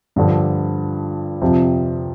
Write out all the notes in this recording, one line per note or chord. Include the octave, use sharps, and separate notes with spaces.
G2 D3 F3
F2 C3 F3